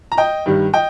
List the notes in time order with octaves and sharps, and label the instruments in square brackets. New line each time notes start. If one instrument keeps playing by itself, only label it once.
[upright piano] A#5
D#5 G5
G2 D#3 G3
D#5 G5